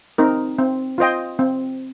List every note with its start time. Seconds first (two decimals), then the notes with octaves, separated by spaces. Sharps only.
0.18 C4 D#4 A#4
0.59 C4
0.98 F4 C5 D#5 G5
1.39 C4